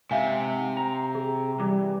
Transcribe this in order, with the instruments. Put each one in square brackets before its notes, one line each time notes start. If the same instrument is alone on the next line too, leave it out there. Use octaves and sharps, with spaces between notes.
[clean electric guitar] G#2 [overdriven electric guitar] C3 [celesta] E5 F5 G#5
[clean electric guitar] A#5
[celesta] G#4
[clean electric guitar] E3 [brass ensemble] G3 [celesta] D6